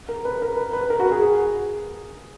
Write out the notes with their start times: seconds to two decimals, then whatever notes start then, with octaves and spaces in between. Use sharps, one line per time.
0.08 A#4
0.25 B4
0.42 A#4
0.57 B4
0.73 B4
0.90 A#4
0.99 F#4
1.11 G#4
1.21 G#4